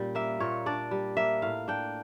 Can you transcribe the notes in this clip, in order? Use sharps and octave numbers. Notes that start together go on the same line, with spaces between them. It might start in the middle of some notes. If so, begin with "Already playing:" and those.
Already playing: A#2 G3 C#4
A#3 E5
A#2 C#5
D4 D5
G3
A#3 E5
A2 F5
D4 G5